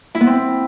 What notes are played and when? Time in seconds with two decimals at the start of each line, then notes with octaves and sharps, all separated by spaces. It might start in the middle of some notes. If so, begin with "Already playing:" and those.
0.15 E4
0.21 B3
0.27 C4